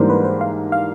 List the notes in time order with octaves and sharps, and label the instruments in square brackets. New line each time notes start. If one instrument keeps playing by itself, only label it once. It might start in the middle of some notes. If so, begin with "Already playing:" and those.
Already playing: [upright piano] G#2 E3 G3 A#3 D4 [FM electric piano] C5
[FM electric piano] B4
C5
F5
F5